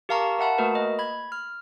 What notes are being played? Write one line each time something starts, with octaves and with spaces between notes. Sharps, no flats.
G4 A#4 F5 A5 A#5 C#6
A#4 E5 F#5 A5 B5
A3 A#3 F#4 A#4 B4
D#5
B5 G#6
F6